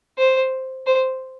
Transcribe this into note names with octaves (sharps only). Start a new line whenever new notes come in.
C5
C5